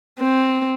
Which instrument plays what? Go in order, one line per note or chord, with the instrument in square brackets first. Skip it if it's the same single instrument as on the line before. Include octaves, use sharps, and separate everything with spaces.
[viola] C4